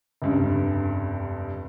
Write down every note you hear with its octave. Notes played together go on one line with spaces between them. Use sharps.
F1 C#2 G2